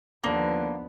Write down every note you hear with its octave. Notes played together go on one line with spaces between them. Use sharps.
D#2 D3 F3 A#3 B3